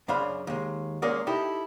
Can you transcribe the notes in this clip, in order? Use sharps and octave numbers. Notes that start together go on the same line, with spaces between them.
F#2 C#3 D4 C5 F5 B5
D#2 G#3
G#3 A#3 C#4 G#4 A#4 D5
D#4 E4 G4 A4